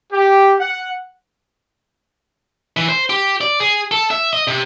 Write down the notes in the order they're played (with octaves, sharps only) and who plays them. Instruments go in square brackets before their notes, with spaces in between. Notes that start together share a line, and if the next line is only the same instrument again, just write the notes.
[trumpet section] G4
F#5
[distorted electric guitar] E3
C5
G4
D5
G#4
A4
E5
D#5
C3